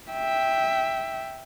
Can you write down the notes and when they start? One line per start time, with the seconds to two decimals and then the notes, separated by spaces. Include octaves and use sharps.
0.12 E5 G5